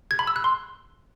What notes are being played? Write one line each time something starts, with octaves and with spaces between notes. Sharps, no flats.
G#6
B5
E6
F#6
C6